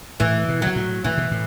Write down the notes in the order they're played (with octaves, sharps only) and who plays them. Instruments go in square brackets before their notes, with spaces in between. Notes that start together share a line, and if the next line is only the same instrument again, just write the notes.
[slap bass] A2 [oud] E3
[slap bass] B2
[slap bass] B2 [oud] F#3
[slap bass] A2
[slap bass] A2 [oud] E3
[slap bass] B2
A2